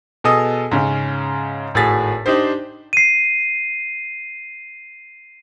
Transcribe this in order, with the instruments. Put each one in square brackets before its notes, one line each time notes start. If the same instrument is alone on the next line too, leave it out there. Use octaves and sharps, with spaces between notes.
[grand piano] B2 G#4 A4 D#5 D#6
G#2 C#3 C#4
G#1 A2 F#4 G#4 A6 B6
D4 D#4 G4 C5
[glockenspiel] C7 D#7